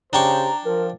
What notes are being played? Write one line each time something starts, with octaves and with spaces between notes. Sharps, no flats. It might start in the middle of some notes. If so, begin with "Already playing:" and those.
C#3 D4 G4 C5 G5 A#5 C#6
F3 A#4